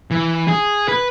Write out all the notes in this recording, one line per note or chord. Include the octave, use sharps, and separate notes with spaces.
E3
G#4
B4